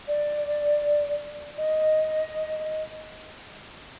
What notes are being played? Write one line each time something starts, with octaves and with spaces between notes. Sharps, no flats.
D5
D#5